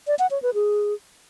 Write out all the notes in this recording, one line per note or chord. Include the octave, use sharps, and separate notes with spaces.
D5
F#5
C#5
B4
G#4